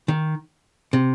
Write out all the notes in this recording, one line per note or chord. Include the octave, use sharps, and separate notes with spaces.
D#3
C3